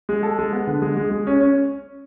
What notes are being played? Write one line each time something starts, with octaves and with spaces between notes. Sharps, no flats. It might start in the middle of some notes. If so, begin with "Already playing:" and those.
G#3
A4
G#3
B3
D3
G#3
G#3
G#3
C#4
C#4